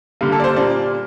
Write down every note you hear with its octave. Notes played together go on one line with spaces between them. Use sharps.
D3 G3 A#3
A4
D5
C5
A#2 G3 A#3 D5